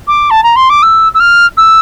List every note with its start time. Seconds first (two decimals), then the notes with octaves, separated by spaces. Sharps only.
0.08 D6
0.30 A5
0.43 A#5
0.56 C6
0.70 D6
0.82 E6
1.14 E6
1.20 F6
1.57 E6